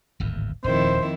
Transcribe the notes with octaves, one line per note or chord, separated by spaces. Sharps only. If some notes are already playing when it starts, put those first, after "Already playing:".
D1 G#1 E2
D#1 F2 D#3 E4 C5